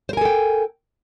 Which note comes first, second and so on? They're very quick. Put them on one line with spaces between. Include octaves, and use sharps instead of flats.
C5 A#4 G#5 A4 G5